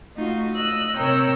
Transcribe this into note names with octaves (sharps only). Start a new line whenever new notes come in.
A3 D#4 F4 F#4
D#5 E6 F#6
C3 A#4 C#5 G5 A#5 E6